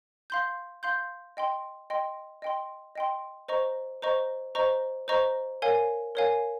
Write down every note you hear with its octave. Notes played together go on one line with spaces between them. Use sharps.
F5 C6 G6
F5 C6 G6
D#5 G5 C6
D#5 G5 C6
D#5 G5 C6
D#5 G5 C6
C5 D#5 A#5 C#6
C5 D#5 A#5 C#6
C5 D#5 A#5 C#6
C5 D#5 A#5 C#6
A#4 C#5 F5 G#5
A#4 C#5 F5 G#5